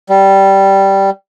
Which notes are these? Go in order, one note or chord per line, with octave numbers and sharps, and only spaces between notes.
G3